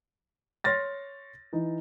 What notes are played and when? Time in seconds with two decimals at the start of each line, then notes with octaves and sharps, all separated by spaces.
0.64 C#5 C6 F6 A6 A#6
1.53 E3 D#4